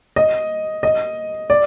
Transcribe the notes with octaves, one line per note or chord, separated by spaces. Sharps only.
D#5
D#5
D5